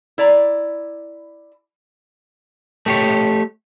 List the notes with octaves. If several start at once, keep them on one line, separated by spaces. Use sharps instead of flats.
E4 D5 A#5
A3 G4 C#5